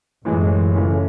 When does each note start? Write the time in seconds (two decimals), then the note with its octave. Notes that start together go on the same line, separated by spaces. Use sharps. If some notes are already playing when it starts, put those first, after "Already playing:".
0.24 F#2 A2 E3 G#3
0.74 C#3 E3 A3 C#4